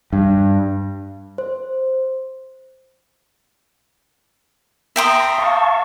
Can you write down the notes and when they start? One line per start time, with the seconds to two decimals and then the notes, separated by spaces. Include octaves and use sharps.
0.13 G2
1.38 C5
4.96 E5 G5 A#5 C6 D#6
5.38 F5 A5 C#6